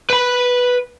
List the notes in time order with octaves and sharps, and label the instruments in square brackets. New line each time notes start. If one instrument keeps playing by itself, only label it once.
[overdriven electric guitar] B4 B5